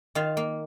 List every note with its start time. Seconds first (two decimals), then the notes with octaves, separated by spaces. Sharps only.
0.15 D#3 F4 F5
0.37 A#3